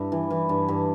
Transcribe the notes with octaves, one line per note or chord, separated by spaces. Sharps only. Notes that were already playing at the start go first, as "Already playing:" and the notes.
Already playing: G2 E4
E3
E3
G2
G2